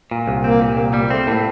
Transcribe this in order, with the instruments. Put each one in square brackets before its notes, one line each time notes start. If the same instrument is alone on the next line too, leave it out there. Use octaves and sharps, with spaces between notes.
[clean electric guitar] A#2
C2
[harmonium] A#3 [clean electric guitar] C4
[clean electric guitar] A#2
C2
[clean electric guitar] G3 [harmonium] A#3
[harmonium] A3 [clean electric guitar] C4
[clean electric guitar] A2 [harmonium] A#3